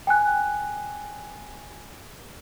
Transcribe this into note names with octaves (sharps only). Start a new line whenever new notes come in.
G5 G#5 F#6